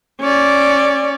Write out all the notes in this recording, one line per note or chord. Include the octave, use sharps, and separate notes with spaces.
C#4 D5